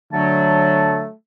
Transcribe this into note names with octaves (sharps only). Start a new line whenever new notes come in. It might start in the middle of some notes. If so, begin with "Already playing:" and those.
D3 F#3 A3 A5